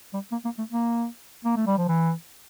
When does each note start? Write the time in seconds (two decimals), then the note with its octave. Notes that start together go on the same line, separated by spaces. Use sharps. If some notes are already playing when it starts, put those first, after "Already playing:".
0.14 G3
0.32 A#3
0.45 A#3
0.58 A3
0.71 A#3
1.45 A#3
1.57 A3
1.67 G3
1.78 F3
1.88 E3